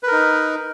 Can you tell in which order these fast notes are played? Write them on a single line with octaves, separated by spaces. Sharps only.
B4 A#4 D#4